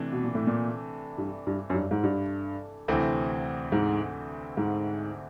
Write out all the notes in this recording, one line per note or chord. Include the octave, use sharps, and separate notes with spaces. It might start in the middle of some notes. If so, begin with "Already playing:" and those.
Already playing: C3 E3 A3 D4
B2
A#2
A2
A#2
G2
G2
F#2
G2
G#2
G2
D2 C3 E3 A3 C4
G#2
G#2